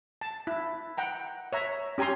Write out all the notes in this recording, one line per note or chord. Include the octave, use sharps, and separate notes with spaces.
A5
E4
F#5 G5 A#5
C#5 E5 A#5
C#4 G4 G#5 A#5 C6